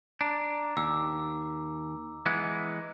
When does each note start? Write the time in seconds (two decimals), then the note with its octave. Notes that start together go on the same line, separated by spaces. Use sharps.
0.21 D4 A#5
0.77 D#2 D6 E6
2.26 E3 G#3 B3